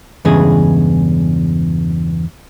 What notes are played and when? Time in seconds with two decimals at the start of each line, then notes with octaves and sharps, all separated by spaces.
0.25 E2 G2 C#3 E3 G#3 G#4